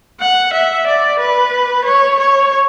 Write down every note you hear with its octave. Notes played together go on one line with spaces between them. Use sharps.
F#5
E5
D5
B4
C#5
C#5